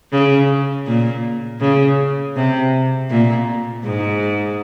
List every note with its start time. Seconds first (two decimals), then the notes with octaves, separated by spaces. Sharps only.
0.12 C#3
0.87 A#2
1.61 C#3
2.36 C3
3.10 A#2
3.84 G#2